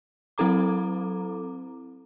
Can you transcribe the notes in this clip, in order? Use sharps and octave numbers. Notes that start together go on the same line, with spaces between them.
F#3 C4 E4 A4 A#5 D6